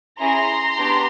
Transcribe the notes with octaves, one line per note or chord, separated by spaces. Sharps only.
C#4 E4 G#4 A#5 C6
B3 D4 G4